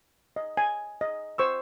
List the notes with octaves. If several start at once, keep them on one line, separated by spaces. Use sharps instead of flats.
D#5
G#5
D#5
C5 C#6 E6